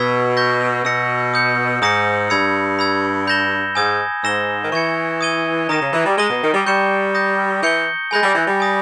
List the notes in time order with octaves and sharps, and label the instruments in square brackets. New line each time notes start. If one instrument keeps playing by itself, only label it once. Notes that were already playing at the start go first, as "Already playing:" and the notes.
Already playing: [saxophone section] B2 [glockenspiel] C#6 E6 G#6 B6
[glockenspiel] C#6 G6 A#6
[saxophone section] B2 [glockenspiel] E6 A#6 C#7
[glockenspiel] D#6 G6 C#7
[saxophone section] G#2 [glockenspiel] D#6 A#6 C#7
[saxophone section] G2 [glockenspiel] B5 E6 G#6 C#7
[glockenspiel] B5 E6 G#6
B5 G6 A#6 E7 G7
[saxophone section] G#2 [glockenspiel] G#5 D#6 G#6
[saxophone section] G#2 [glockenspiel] E6 A#6 E7 G7
[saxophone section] D#3
[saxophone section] E3 [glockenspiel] C#6 G#6 C#7
[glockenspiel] D#6 G#6 D#7 G7
[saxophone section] D#3 [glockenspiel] A#5 D#6 A#6 E7
[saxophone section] C#3
E3
G3
[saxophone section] G#3 [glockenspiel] D#6 A#6 D#7 G7
[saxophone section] B2
D#3
G3
[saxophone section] G3 [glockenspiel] C#6 G6 C#7 E7
[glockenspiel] D#6 G6 A#6
[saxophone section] E3 [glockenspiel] G6 C#7 G7
[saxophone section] G#3 [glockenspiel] G#5 B5 G6 A#6
[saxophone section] G3
E3
G3
[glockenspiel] G#5 D#6 A#6